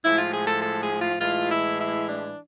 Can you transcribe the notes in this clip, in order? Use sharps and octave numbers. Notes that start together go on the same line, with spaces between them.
A2 F3 G#3 E4
F4
G#4
A4
A4
G#4
F4
A2 E3 G#3 F4
E4
E4
D4